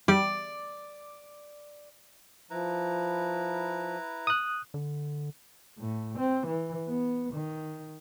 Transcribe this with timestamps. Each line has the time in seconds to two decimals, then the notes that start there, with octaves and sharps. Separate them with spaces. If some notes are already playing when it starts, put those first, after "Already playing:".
0.08 G3 D5
2.50 F3 E4 B4 A#5
4.27 D#6 F#6
4.74 D3
5.79 A2
6.18 C4
6.46 E3
6.88 B3
7.33 D#3